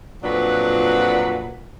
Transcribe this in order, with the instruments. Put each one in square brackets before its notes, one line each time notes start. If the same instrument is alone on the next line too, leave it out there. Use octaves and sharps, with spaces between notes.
[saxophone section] F2 A#2 F#3 D4 B4 F#5